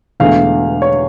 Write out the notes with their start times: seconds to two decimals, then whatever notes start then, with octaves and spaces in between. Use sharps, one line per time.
0.20 E1 E2 D3 A3 F5
0.82 C#5